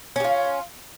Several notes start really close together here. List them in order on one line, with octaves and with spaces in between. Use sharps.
C#4 G4 F4